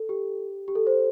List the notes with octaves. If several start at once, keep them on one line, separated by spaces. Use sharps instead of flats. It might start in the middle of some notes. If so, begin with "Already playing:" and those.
Already playing: A4
G4
G4
A4
C5